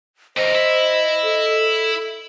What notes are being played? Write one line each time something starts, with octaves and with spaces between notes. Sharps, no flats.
F2 A#4 C5 D#5
E4
A4